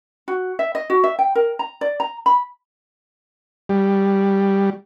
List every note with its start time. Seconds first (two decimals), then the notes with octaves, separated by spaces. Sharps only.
0.28 F#4
0.59 E5
0.75 D#5
0.90 F#4
1.04 E5
1.19 G5
1.35 A#4
1.59 A#5
1.81 D5
2.00 A#5
2.26 B5
3.69 G3